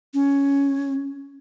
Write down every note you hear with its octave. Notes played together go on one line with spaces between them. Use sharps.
C#4